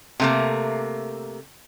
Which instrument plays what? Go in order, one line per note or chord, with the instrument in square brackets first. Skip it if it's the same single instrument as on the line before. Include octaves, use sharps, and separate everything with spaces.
[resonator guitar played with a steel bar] C3 A3 A#3